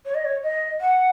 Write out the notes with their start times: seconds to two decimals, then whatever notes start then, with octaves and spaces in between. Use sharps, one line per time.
0.05 C#5
0.15 D#5
0.25 C#5
0.43 D#5
0.81 F#5